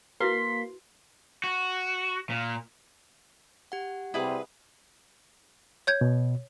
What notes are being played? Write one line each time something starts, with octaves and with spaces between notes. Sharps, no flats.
A#3 E4 F#4 B4 C6 B6
F#4
A#2
G4 F#5
C3 G3 E4 G#4 B4
C#5 G6 G#6
B2